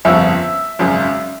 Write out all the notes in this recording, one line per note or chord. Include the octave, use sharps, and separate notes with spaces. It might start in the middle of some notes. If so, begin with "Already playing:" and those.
G1 F2 C#3 E5
G#1 F#2 C#3